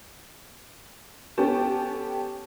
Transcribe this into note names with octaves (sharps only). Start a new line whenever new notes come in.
B3 C#4 G4 A4 G5 A5